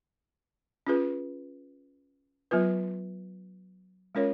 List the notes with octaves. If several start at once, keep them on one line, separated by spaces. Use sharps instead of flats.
C#4 F4 G#4 B4
F#3 B3 F4 B4
G#3 C#4 F4 A#4 C#5